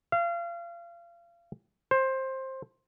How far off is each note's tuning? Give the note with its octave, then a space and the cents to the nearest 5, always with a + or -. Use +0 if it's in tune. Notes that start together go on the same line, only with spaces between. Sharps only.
F5 -30
C5 +15